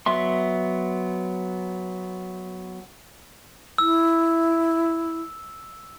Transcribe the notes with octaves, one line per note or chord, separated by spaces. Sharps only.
F#3 B3 E5 C6
E4 E6